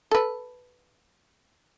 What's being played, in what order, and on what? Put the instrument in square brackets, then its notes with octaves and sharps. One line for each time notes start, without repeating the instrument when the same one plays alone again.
[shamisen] A4 B4